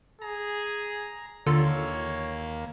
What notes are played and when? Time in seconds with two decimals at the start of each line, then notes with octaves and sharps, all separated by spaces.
0.22 G#4 A#5
1.46 D#2 D3 A#3 F4 A4 C#5